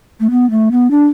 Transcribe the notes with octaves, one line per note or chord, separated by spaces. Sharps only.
A3
B3
A3
B3
D4